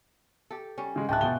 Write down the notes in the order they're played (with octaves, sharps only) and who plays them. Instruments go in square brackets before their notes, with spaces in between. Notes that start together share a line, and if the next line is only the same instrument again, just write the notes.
[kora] G4 A4
G3 C#4
[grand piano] C#3 G#3
[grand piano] D1 F#6 [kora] G#3 E4 [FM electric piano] G5 A5
[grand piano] B2 G7 [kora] G#3 F4